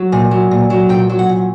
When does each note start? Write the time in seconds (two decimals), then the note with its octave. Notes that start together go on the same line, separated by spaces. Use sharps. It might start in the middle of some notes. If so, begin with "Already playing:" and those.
Already playing: F#3
0.12 A#2
0.31 F#3
0.51 A#2
0.70 F#3
0.89 A#2 G5
1.09 F#3
1.19 F#5
1.29 A#2